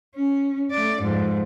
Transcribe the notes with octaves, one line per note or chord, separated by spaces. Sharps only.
C#4
A3 D5
F2 G#2